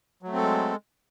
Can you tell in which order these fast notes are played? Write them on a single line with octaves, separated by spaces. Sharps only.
F#3 A3 C4 A4 G#3